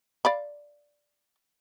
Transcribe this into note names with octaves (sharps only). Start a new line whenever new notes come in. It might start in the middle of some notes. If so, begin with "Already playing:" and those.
D5 F5 B5